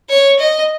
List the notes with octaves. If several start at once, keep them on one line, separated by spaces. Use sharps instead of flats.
C#5
D#5